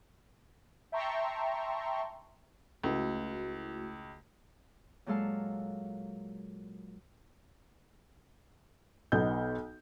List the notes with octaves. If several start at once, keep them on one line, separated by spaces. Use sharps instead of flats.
E5 G5 A5 A#5 C6 C#6
C#2 A3 E4 F#4
A#2 F#3 G#3 A4 F5 A5
B1 B3 D#4 G6